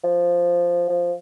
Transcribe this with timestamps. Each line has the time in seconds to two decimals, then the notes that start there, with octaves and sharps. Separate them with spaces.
0.04 F3
0.89 F3